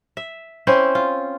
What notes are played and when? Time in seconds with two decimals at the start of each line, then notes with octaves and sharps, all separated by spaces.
0.17 E5
0.67 C4 C#4 E4 C5
0.95 F4